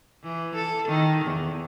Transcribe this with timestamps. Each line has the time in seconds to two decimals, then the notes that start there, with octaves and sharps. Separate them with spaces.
0.23 E3
0.55 A4
0.88 D#3
1.24 E2